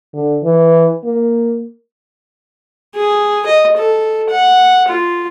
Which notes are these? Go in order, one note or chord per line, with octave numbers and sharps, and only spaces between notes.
D3
E3
A#3
G#4
D#5
A4
F#5
F4